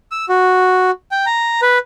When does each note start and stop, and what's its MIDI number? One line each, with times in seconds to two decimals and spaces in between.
0.11 0.25 88
0.29 0.91 66
1.11 1.25 79
1.26 1.61 82
1.62 1.78 71